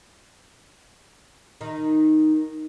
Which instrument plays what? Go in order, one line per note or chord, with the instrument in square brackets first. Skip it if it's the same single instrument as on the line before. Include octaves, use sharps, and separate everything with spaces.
[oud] D#3 D#4